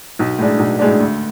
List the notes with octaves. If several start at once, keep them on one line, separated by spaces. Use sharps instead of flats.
B1
A2 G#3 D4
B1
A2 G#3 D4
D2